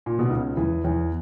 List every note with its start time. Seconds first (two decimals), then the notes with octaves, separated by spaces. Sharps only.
0.06 A#2
0.19 B2
0.30 C#2 C#3
0.57 E2 E3
0.84 E2 E3